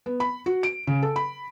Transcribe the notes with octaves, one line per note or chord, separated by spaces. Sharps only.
B3
B5
F#4
D7
C#3
A4
B5